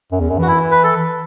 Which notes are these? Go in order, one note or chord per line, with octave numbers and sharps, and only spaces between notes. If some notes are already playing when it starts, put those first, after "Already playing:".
F#2
E2
F#2
E3 F#4
E4
B4
A4